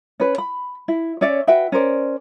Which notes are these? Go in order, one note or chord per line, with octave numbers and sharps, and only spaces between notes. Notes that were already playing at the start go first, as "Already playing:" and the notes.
C#4 B4
B5
E4
C#4 C#5 D5 E5
F#4 B4 E5 G5
C#4 A#4 C5 D5